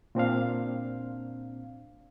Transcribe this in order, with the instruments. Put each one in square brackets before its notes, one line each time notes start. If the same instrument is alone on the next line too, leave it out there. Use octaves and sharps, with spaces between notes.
[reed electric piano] A#2 C4 D4 F5